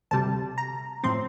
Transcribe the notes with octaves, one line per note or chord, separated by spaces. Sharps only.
D2 C3 G3 A5
A#5
A2 F3 C4 C6